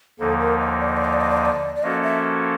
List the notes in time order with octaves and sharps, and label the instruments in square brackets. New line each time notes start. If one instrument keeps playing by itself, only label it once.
[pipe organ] D#2 D3 F3 A#3 D#4 [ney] A4
[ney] A#4
D#5
D5
D#5
D5
D#5
D5
D#5
D5
D#5
D5
D5
[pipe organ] F3 A#3 C#4 F#4 A4 [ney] D#5
[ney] E5